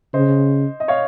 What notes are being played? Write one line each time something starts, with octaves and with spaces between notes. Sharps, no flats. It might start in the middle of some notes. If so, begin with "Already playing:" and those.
C#3 C5 D#5
D#5
C#5 F5